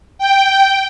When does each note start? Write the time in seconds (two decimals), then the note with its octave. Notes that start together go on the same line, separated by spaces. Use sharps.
0.18 G5